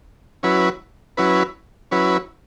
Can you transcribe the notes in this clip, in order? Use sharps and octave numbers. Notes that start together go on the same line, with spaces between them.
F#3 C#4 E4 B4
F#3 C#4 E4 B4
F#3 C#4 E4 B4